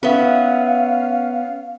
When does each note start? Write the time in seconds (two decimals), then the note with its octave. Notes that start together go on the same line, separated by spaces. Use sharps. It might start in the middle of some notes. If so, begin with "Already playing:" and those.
0.03 B3 C#4 B4 E5 F5